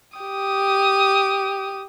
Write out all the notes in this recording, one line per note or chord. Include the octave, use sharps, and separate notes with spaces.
G4 D#6